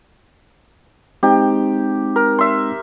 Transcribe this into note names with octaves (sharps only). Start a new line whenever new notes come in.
G#3 C4 D#4 G4
A#4
E5 C6